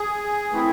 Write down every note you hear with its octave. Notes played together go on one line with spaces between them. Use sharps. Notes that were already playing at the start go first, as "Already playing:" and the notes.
Already playing: G#4
E3 A3 C4 E4